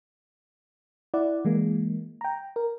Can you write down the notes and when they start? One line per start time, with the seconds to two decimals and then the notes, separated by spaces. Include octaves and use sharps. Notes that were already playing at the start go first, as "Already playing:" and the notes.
1.14 E4 D5 F#5
1.45 E3 G#3 A#3
2.21 G5 A#5
2.56 A#4